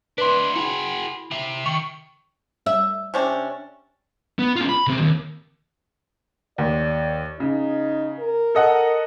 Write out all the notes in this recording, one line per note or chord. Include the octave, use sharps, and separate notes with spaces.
D4 E4 B4 C6 B6
E4 F#4 G#4
C3 E5
D#3 C#6 C#7
E5
C3 C#4 D4
B3
C#4 F4
B5
C#3 C4
D#2
D#2 D5
C#3 D#4
A#4
A4 D#5 F#5